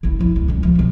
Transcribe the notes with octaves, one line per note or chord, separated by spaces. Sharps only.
F#1 E4
F3 E4
D2
C#2 C#3
F3
F#2 B2